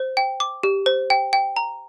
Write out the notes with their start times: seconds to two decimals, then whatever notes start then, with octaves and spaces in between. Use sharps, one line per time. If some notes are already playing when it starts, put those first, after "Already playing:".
Already playing: C5
0.17 G5
0.40 D6
0.63 G4
0.86 C5
1.10 G5
1.33 G5
1.57 A#5